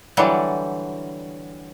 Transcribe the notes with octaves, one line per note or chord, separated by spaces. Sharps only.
D3 E3 F#3 G3